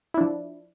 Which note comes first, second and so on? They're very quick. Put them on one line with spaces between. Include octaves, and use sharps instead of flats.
E4 D4 F3